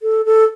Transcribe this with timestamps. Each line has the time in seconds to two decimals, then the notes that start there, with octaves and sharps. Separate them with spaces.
0.03 A4
0.26 A4